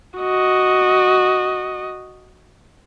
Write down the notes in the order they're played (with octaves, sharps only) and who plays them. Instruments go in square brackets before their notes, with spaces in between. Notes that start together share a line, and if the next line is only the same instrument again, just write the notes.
[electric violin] F#4 D#5